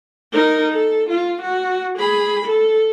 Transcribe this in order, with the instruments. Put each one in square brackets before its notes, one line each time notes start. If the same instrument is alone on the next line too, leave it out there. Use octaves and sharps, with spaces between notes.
[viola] D#4 A#4
A4
F4
F#4
G#4 B5
A4